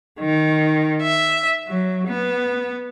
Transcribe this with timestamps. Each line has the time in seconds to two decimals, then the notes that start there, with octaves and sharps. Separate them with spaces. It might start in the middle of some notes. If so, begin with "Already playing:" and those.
0.19 D#3
1.03 E5
1.67 F#3
2.06 B3